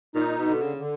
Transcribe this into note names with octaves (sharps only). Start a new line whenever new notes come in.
A#2 D#4
B2
D3
C#3
D3